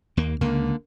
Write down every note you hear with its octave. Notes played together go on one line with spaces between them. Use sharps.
D#2 A#3
C#2 D3 A#3